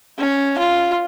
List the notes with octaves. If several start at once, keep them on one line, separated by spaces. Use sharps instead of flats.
C#4
F4